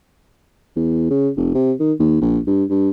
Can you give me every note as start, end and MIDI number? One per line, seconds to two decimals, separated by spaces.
0.76 1.08 40
1.10 1.29 49
1.37 1.51 29
1.55 1.72 48
1.80 1.92 51
2.00 2.18 39
2.21 2.39 34
2.47 2.64 43
2.69 2.90 43